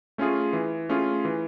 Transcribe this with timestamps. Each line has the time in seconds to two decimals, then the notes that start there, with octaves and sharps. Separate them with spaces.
0.18 A3 C#4 F4 G#4
0.53 E3
0.89 A3 C#4 F4 G#4
1.25 E3